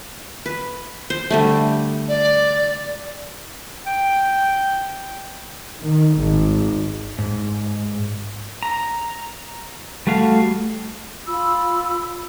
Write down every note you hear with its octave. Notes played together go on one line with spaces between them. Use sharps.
B4
C5
D3 G3 A3
D5
G5
D#3
G#1
G#2
A#5
G3 A3 F#4 F5
F4 B5 E6